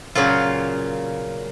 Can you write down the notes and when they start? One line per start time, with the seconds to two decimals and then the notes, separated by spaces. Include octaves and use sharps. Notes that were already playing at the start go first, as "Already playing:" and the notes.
0.15 A#2 C#3 F#3 A#3 F4